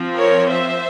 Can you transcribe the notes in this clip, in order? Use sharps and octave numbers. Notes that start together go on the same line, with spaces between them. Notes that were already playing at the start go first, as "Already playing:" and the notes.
Already playing: F3 C4
A#4 C#5
C5 E5